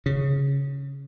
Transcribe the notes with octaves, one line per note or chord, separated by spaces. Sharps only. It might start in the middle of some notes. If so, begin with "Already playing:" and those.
C#3